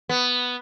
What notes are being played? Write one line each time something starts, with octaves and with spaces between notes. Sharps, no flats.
B3